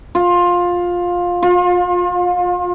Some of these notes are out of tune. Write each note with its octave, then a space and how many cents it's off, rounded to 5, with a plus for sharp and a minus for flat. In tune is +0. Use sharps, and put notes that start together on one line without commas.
F4 +15
F4 +35